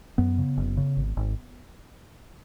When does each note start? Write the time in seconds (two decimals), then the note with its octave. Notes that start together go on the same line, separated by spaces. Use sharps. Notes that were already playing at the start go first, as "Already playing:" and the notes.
0.18 F#2 B3
0.38 C#3
0.57 F#1
0.77 C#3
0.97 G#1
1.17 G#1